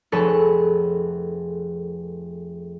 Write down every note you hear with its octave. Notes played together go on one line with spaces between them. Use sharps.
F1 G#4 A4 B4 C#5 C#7